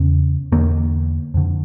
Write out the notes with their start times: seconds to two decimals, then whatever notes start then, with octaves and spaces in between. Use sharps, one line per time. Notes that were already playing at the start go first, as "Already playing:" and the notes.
Already playing: E2 C#3 C#4
0.52 E2 D3 A#3
1.34 F2 D3